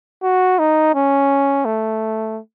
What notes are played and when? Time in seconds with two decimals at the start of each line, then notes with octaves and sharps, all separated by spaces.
0.23 F#4
0.59 D#4
0.95 C#4
1.65 A3